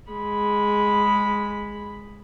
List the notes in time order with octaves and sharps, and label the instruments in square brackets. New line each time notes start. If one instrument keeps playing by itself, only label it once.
[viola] G#3 B5